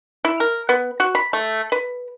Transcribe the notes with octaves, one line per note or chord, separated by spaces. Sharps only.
E4
A#4
B3
F#4
B5
A3
B4